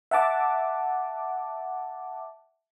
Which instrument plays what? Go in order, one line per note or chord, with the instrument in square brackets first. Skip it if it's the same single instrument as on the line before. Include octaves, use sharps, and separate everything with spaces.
[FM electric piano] E5 F#5 A5 D6